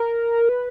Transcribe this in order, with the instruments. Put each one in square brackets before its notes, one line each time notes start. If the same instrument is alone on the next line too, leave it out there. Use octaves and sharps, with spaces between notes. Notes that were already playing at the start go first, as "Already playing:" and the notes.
Already playing: [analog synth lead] A#4
B4